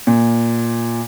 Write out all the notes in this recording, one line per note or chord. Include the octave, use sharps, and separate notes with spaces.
A#2